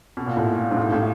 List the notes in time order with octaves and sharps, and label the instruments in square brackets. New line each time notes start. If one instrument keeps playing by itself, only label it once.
[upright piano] B2
A#2
A2
G#2
A2
A2